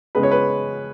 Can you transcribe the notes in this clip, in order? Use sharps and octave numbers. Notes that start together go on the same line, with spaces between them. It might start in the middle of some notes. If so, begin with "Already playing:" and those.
C#3 G#3 B3 B4
C#5
B4